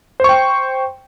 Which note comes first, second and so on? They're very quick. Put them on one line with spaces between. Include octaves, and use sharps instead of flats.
C5 C#6 G5